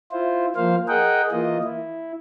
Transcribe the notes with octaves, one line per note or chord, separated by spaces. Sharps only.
E4 F4 C5
F3 A#3 C5 F5
G#4 A#4 D#5 F#5 G5
E3 A#3 F4 D#5
E4